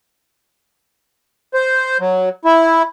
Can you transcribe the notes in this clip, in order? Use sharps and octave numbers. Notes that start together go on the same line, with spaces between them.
C5
F#3
E4